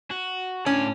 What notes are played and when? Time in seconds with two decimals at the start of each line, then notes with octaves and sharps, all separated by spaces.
0.11 F#4
0.66 A2 C#4 D5